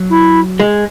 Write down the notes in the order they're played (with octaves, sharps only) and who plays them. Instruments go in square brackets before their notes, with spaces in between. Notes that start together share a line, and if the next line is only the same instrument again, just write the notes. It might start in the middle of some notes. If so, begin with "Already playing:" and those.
Already playing: [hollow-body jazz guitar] F#3
[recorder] E4
[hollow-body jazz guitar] G#3